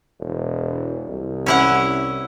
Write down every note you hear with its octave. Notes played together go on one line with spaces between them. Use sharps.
E1
C2
C#4 E4 F#5